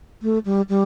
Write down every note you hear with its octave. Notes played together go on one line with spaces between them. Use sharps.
A3
G3
G3